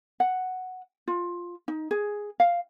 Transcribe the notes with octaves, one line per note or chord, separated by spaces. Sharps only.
F#5
F4
D#4
G#4
F5